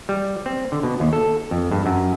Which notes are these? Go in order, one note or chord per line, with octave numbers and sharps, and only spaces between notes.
G3
C4
D3
B2
D#2
A4
F2
G2
F#2